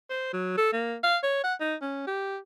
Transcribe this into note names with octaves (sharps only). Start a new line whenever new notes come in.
C5
F#3
A4
A#3
F5
C#5
F#5
D#4
C#4
G4